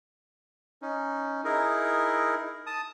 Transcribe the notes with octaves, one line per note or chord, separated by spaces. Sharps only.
C#4 D#4
D#4 E4 G#4 A#4
A5 D#6